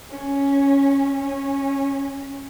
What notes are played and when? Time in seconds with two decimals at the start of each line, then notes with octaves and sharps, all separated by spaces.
0.10 C#4
1.24 C#4